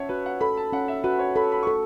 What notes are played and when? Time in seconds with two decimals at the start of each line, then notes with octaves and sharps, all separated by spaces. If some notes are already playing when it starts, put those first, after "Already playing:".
Already playing: C#4 C#5 E5 F#5 A5
0.09 F#4 B4
0.26 F#5
0.41 A4 B5
0.57 A5
0.73 C#4 F#5
0.88 E5
1.04 F#4 B4
1.19 C#5
1.36 A4 B5
1.52 B5
1.63 A4 C#6